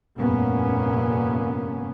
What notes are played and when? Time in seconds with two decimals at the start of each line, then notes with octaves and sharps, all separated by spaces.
0.18 F1 G2 A#2 A#3 B3 C#4